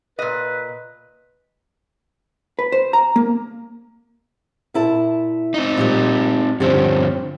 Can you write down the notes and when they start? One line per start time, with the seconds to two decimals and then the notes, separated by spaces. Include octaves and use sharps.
0.19 A#2 B4 D#5
2.59 B4
2.72 C5
2.93 A#5
3.16 A#3
4.74 A#2 E4 A5
5.54 C4 D#4
5.77 A#2 F3 G3
6.60 G2 D3 F3 C4 C#4 G4